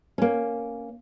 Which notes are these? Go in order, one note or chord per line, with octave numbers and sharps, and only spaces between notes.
A#3 C#4